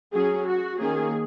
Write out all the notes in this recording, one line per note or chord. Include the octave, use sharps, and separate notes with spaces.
F#3 C#4 G#4
F#4
D#3 A#3 C#4 G#4